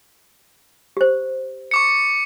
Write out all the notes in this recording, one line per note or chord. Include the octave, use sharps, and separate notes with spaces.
G4 C5
C#6 D6 C#7